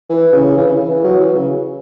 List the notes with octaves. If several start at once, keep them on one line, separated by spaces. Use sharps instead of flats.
E3
C#3
E3
C#3
E3
F#3
E3
C#3